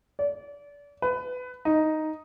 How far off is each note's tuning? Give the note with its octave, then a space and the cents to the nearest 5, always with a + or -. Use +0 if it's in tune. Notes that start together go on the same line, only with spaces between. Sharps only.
D5 -30
B4 +20
D#4 +0